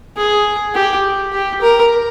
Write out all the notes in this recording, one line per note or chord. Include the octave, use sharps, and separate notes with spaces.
G#4
G4
G4
A#4